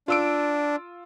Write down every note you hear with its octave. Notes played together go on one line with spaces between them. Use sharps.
D4 F4 E6 D7